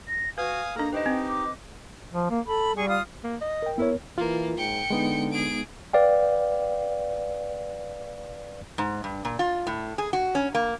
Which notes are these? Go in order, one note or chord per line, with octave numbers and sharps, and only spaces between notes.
A#6
F#4 B4 F5 G#5 D#6
A#3 D4 D#4 A4 A#5
D#4 G4 B4 C5 D#5 G5
C4
D6
F3
A#3
A4 B5
G3 G#4 C#6
F4 F5 D#6
A#3
D#5
A#4 G5
B3 E4 A#4 C#5
E3 A#3 F4
G#2 G5 C#7
D3 G#3 B3 D#4
G#4 D7
B4 D5 F5 G5
G#2
G2
A#2
F4
A2
G#4
F#4
C#4
A#3